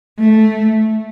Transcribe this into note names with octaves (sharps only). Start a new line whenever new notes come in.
A3